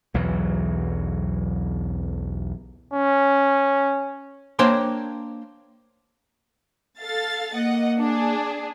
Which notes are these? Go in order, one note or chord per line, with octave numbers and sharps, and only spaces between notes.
B1 E2 E3 F#3
C#4
A#3 D4 C5 C#5 G5 C6
A4 F5 A6
A#3 D#5 F#5
D4 G#4